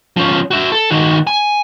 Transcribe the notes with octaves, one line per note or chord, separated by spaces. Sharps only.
F3 C#4
F#4 E5
A4
D#3 F#4
G#5